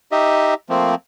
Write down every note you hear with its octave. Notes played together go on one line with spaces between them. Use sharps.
D#4 G4 D#5 E5
F3 A3 A#3 C4